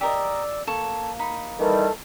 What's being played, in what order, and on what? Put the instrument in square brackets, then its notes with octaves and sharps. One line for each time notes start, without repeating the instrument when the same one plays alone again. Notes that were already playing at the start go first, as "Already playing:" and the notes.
[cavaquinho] G4 A#4 D#5 [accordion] D5 E6
[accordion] A#3 [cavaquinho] A4 C#5
[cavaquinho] D#4 B5
[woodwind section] D#3 E3 G3 [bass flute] A4